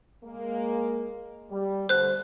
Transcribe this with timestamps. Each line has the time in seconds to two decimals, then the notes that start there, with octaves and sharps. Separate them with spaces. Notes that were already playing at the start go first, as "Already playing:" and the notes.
0.24 G#3 A#3
1.51 G3
1.89 B2 D3 A3 C5 F#6